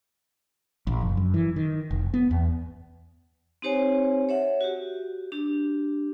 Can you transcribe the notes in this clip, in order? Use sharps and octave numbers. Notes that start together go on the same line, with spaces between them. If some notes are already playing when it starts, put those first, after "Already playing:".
A#1
F#1
F#2
E3
D#3
F1
B3
E2
C4 D#4 G4 C5 C#5 G#5
C#5 E5 F#5
F#4 G4
D4 G4